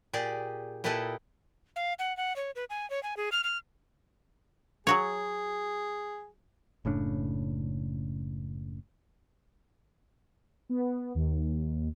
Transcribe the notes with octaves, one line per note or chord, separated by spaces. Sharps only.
A#2 G4 G#4 D5
A#2 E4 G4 A4 B4 D#5
F5
F#5
F#5
C#5
B4
G#5
C#5
G#5
G#4
F6
F6
F#3 F#4 G#4 C#5
F#1 A2 C#3 D4
B3
D#2